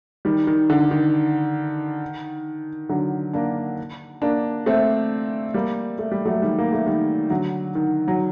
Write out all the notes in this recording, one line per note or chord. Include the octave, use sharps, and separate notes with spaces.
D#3 G3
D#3
D3
D#3
D3 F#3
A#3 D4
A#3 D4
A3 C4
G3 A#3
A3
G3
F#3 A3
D#3 G3
A#3
A3
D#3 G3
D3 F#3
D#3
F#3